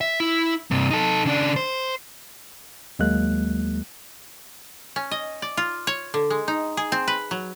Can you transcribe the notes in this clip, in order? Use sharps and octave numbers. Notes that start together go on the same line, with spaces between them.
E5
E4
G2 C3
D#4 A4
C#3 D4
C5
D#2 F#3 G#3 A#3 F#6
C#4
D#5
D5
F4
C#5
D3
G#3
D#4
G#4
C4
B4
F#3